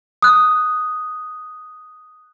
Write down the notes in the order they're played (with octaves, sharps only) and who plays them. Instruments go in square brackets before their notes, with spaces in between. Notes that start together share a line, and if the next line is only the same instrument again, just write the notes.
[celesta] D#6 F#6